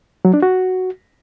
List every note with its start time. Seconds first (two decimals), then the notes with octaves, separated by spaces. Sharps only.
0.25 F#3
0.34 D4
0.42 F#4